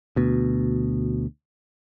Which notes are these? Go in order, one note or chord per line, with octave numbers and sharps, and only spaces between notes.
D2 B2